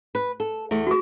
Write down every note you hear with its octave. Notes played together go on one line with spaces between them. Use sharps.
B4
A4
E2 A3
F#4 G#4